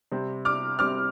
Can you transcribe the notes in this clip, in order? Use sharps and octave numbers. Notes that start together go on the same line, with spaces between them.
C3 G3 C4
D6 F6
C3 G3 C4 D6 F6